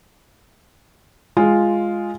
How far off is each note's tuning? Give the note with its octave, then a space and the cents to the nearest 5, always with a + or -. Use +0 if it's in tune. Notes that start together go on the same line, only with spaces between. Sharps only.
G#3 +0 F4 +0